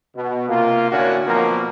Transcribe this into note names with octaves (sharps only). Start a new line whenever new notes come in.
B2
C3 A#3 F4
A2 D3 A#3 C#4 D4 F#4
B2 F3 F#3 A#3 C4 A#4